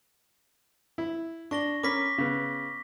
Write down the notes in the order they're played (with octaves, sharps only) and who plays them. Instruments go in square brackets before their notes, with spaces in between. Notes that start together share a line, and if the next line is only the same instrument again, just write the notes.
[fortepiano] E4
[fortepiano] D4 [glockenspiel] C#6 A#6 G7
[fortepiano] C#4 A#4 B5 [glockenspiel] D6 B6
[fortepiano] C#3 B3